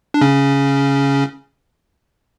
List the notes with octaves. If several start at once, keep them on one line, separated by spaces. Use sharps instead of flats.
D4
C#3 C#4